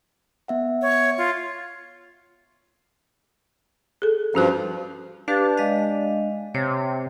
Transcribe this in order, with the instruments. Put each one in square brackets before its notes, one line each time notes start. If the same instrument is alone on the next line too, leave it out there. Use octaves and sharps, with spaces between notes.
[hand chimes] B3 E5 F#5
[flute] C#5
F4
[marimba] G#4 A4
[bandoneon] G2 F3 [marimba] C#4 F#4 F#6
[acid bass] D4 [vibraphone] G4 B4 F5
[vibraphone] G#3 D#5 F5
[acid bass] C3 [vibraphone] C#5